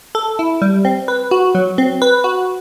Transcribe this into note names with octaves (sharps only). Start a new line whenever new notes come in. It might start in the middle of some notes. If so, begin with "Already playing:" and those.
A4
E4
G3
C4
B4
F#4
F#3
C4
B4
F#4